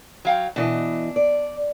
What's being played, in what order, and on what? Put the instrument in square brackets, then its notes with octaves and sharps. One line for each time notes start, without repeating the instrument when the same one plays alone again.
[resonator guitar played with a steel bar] F#3 F5 G5
[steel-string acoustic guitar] B2 E3 D#5 [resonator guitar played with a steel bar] D4
[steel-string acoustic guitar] D5